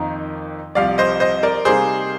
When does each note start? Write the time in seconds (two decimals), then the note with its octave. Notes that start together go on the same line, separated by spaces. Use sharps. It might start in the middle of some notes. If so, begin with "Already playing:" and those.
Already playing: F2 D#3 A#3 D#4
0.75 C2 C3 F3 D5 F5
0.98 C5 D#5
1.20 C5 D#5
1.43 A#4 D5
1.65 C3 G3 A#3 D#4 G#4 C5